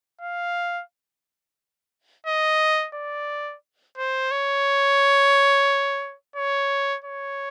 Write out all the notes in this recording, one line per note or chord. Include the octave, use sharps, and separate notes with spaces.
F5
D#5
D5
C5
C#5
C#5
C#5